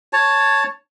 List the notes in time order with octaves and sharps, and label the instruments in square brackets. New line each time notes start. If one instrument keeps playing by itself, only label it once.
[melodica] C#5 A5